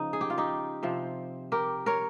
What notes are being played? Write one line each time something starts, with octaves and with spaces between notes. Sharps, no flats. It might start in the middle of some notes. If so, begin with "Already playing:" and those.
Already playing: C#3 F3 D#4
G#4
G4
F4
D#4 G4
C3 F3 C4
G4 A#4
A#4 C#5